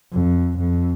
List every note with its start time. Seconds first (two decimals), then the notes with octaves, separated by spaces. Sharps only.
0.12 F2
0.59 F2